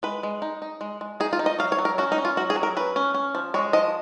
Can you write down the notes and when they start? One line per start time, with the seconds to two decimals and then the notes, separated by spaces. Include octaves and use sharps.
0.03 G#3 B4
0.23 G#3
0.42 D#4
0.62 D#4
0.81 G#3
1.01 G#3
1.20 D#4 G#4
1.33 F4
1.39 D#4
1.46 D#5
1.59 F#3 F5
1.72 C#5
1.79 F#3
1.85 A#4
1.98 C#4 F#4
2.12 D#4
2.18 C#4
2.25 F4
2.37 F#3 F#4
2.50 G#4
2.56 F#3
2.63 A#4
2.76 C#4 B4
2.96 C#4
3.14 C#4
3.35 F3
3.54 G#3 C#5
3.73 F3 D#5